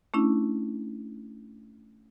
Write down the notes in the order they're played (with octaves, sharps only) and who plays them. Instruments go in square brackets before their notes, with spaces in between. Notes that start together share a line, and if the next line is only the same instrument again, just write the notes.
[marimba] A3 C#4 D4 E4